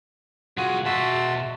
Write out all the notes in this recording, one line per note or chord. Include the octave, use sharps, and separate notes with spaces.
C2 F4 F#4 G#4 F#5
B2 F#4 E5 A5 C6